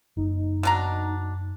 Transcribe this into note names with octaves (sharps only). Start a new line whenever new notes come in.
F#1 D#4
B2 D4 A#5